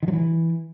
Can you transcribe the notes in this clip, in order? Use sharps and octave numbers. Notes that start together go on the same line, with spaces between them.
D#3
F#3
E3